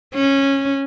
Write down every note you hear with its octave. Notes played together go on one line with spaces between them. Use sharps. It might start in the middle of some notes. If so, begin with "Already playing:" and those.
C#4